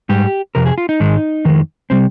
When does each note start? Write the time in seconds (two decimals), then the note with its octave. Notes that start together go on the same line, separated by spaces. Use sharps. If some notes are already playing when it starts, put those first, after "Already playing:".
0.09 G#2 G3 G4
0.55 F2 C3 A#4
0.66 G#4
0.78 F4
0.89 D#4
1.00 G#2 D#3 G#3
1.45 F2 D#3 G#3
1.90 C3 G3 C4